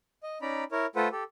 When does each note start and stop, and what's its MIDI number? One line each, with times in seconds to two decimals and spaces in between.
0.23 0.38 75
0.42 0.64 61
0.42 0.64 63
0.42 0.64 74
0.42 0.64 82
0.42 0.64 83
0.72 0.86 64
0.72 0.86 70
0.72 0.86 73
0.96 1.09 57
0.96 1.09 65
0.96 1.09 69
0.96 1.09 71
0.96 1.09 72
0.96 1.09 78
1.12 1.24 67
1.12 1.24 69